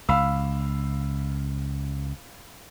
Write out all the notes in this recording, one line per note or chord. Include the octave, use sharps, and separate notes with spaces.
C#2 F5 B5 E6